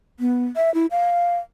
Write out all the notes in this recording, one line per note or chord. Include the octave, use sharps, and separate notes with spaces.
B3
E5
E4
F5